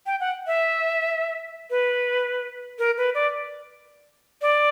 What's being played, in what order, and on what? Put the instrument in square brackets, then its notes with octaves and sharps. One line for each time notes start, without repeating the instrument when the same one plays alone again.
[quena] G5
F#5
E5
B4
A#4
B4
D5
D5